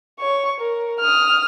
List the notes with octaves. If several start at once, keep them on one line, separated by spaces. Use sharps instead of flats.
C#5 C#6
A#4
D#6 F6